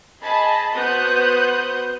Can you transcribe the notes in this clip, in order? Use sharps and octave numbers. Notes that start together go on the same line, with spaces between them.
G#4 D#5 A5 B5
B3 F#4 C5 D#6 F#6 G6